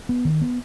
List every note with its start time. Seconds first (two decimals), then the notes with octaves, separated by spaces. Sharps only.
0.09 B3
0.25 D#3
0.41 B3